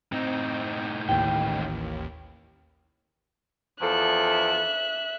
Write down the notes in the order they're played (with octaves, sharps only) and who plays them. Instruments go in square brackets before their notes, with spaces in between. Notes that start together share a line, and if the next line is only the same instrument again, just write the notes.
[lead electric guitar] A2 D#4 [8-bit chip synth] C4
[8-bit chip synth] A1 D#2 [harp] G5
[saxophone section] E2 F3 A4 [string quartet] E5 F#6